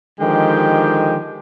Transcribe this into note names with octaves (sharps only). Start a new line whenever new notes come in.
D3 D#3 F3 G#3 G4 G5